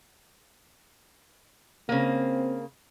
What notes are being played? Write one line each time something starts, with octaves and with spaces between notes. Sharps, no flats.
C#3 A#3 C4